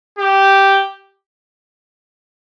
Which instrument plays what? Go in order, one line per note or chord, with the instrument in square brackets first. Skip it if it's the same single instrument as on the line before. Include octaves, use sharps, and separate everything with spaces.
[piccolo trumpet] G4